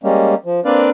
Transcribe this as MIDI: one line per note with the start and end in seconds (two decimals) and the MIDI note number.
0.03 0.35 55
0.03 0.35 56
0.03 0.35 58
0.03 0.35 61
0.45 0.60 53
0.65 0.90 58
0.65 0.90 60
0.65 0.90 62
0.65 0.90 71
0.65 0.90 74
0.65 0.90 77